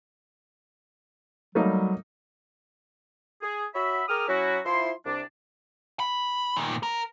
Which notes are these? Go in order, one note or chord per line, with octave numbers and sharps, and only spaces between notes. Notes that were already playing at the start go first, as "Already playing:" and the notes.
F#3 G3 A3 A#3 D#4
G#4
F#4 C#5 E5 B5
G#4 A#4 G5 D6 D#6 F6
F#3 C#4 E4 F#4
F3 E4 C6
C2 D4
B5
A#2 D#3
A#4